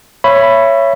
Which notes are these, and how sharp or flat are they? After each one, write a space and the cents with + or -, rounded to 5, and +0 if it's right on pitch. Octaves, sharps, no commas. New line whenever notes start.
C#5 +0 E5 +30 B5 +0